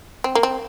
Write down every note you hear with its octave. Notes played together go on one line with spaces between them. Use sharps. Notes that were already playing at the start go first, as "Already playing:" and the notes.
C4
A#3
C4